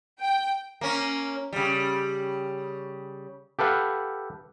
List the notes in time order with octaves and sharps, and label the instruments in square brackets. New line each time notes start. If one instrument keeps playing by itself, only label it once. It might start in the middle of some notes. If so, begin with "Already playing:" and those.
[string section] G5
[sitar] A#3 C#4
C#3 G3
[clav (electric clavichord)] G4 A4 B4 F5 F#5